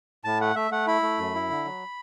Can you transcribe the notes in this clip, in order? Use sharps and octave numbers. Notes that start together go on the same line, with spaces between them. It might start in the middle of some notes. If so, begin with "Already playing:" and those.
A2 A5
A3 F#5
A3 E5
A3 F#5
E4 B5
A3
F#2
E4
D3
F#3